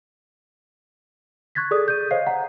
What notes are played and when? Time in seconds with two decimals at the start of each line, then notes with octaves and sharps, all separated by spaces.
1.55 C#6 F#6 G#6 A6 B6
1.71 G#4 A4 D5 D#6
1.88 G6 D#7
2.11 C5 C#5 D#5 F5 C7
2.27 F#5 A#5